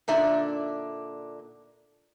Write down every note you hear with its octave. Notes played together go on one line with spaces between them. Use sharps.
A#2 D3 D4 D#4 D5 E5